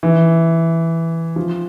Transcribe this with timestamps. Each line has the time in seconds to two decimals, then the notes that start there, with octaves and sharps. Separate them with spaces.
0.03 E3
1.36 F3